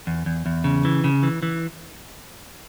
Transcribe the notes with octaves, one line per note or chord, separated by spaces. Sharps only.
E2
E2
E2
C#3
E3
C#3
E3
E3